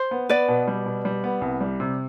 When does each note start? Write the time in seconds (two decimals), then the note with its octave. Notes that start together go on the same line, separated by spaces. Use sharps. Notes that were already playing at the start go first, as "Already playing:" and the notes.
Already playing: C5
0.11 B3
0.29 B3 B4 D5
0.48 B2
0.68 G3
0.86 B2
1.05 G3
1.24 B3
1.41 C2
1.61 G3
1.80 C3